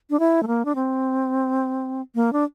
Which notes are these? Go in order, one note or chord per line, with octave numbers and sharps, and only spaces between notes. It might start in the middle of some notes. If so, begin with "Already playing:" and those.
D4
E4
A3
A#3
D4
C4
A#3
D4